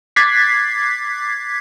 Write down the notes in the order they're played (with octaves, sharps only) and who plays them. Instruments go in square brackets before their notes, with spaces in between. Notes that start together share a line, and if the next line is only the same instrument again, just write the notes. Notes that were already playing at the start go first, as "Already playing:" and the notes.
[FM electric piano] D6 F#6 G#6 A6 B6 C7